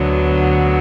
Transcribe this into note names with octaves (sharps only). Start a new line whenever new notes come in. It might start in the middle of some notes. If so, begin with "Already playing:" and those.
Already playing: D2 D3 F#3 B3